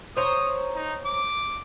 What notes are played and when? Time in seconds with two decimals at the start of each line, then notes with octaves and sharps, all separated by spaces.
0.17 C5 C#5 A#5 D#6
0.76 D#4
1.05 D6